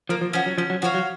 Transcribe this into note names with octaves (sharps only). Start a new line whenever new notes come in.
F3 A#3
F3
F3 C#4 F#4
F#3
F3 C#4
F#3
F3 F#4 C#5 F5
F#3